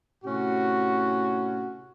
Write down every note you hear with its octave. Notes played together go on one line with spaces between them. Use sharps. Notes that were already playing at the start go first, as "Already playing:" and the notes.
A2 C3 C#4 F#4